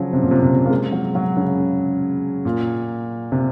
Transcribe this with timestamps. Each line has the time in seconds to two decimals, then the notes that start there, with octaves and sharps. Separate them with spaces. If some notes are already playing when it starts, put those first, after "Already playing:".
Already playing: C#3 F3 F#3
0.13 C3
0.23 A#2
0.31 C3
0.42 C3
0.66 A#3
0.70 G#3
0.92 F#3
1.15 F#3
1.37 C#3
2.45 A#2
3.32 C3